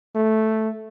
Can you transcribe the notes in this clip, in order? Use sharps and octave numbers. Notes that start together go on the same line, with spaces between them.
A3